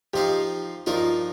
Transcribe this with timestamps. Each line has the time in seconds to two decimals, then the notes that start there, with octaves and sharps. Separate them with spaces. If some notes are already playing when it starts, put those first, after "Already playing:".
0.13 F3 D#4 G4 C5 F5
0.86 G2 F3 D#4 F4 A#4